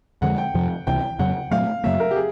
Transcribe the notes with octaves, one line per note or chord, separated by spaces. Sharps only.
F2 D3 F3 G#3 F#5
G5
F2 C3 F3
C#2 C3 E3 G5
F2 C#3 F#3 F#5
A#2 F#3 A3 C4 F5
F#2 C#3 F#3 A#3 E5
A#4
G4
G#4